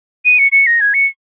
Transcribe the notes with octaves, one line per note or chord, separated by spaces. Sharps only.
D#7
C#7
C#7
A#6
G#6
C#7